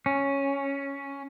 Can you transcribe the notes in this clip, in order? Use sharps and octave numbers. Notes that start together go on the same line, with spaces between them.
C#4